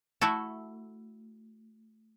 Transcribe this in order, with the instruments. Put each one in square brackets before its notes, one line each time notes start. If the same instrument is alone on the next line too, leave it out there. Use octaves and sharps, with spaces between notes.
[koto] A3 E4 F#4 A4